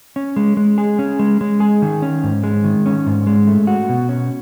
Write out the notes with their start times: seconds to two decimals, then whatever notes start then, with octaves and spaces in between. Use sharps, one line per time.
0.16 C#4
0.36 G#3
0.57 G#3
0.78 G#4
0.99 C#4
1.19 G#3
1.41 G#3
1.60 G#4
1.82 D#3
2.02 C#4
2.24 G#2
2.44 G#3
2.64 D#3
2.86 C#4
3.06 G#2
3.27 G#3
3.47 A3
3.67 F#4
3.89 B2
4.09 C#4